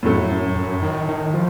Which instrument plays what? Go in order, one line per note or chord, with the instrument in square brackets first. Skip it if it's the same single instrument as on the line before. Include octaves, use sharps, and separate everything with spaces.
[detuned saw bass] F2 [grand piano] A2 F#3 A3
[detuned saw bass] F#2
F#2
D#3
D#3
F3